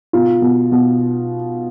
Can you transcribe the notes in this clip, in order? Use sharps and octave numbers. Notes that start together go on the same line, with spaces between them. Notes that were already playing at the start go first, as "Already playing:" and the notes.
B2 F4
B2
B2